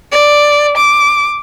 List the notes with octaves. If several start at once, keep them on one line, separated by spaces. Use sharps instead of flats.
D5
D6